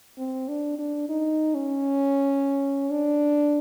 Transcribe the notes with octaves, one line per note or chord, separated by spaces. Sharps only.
C4
D4
D4
D#4
C#4
D4